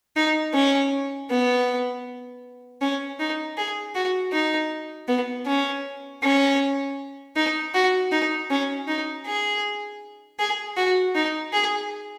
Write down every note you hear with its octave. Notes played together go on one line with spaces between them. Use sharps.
D#4
C#4
B3
C#4
D#4
G#4
F#4
D#4
B3
C#4
C#4
D#4
F#4
D#4
C#4
D#4
G#4
G#4
F#4
D#4
G#4